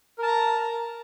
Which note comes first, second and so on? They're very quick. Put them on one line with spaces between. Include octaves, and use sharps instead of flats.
A#4 A5 A#5